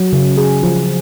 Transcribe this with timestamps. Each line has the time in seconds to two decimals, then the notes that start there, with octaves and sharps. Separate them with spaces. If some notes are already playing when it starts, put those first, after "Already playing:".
Already playing: F#3
0.13 C#3
0.37 G#4
0.63 F3